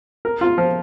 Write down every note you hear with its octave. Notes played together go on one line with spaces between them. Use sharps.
A#4
F4
F3